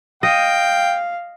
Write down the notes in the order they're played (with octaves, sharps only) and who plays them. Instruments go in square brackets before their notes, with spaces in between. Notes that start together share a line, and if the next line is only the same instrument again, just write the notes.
[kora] D#5 [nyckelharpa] F5 [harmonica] G5